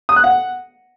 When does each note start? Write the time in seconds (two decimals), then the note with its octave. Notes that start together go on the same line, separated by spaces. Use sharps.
0.09 D#6
0.16 F#6
0.24 F#5